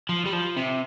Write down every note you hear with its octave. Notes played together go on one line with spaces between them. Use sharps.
F3
G3
F3
C3